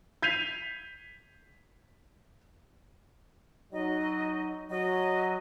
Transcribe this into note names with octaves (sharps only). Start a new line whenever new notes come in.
G6 G#6 B6 C7 D#7 F7
F#3 D#4 D#5
F#3 D#5